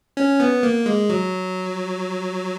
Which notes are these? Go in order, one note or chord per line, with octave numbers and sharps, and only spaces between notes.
C#4
B3
A#3
G#3
F#3